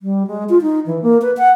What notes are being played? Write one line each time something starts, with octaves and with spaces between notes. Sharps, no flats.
G3
G#3
F4
D#4
E3
A#3
B4
F#5